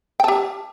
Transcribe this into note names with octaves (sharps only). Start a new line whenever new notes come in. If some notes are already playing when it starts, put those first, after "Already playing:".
G4 G5 A5